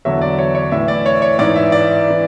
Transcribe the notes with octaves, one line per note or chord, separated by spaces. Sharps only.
E2 D3 F#3 E5
D5
C#5
C#5
A2 E3 E5
D5
C#5
C#5
G#2 E3 D5
E5
D5
E3